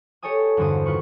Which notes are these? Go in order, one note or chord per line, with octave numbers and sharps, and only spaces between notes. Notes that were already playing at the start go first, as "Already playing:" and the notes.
G4 A4 C#5 D#5 G#5 D#6
E2 G2 D3 F#4 C5 D#6
C2 D#3 F4 B4 C#6